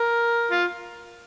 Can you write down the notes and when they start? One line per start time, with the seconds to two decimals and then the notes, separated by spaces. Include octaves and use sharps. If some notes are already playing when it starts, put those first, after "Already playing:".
Already playing: A#4
0.51 F4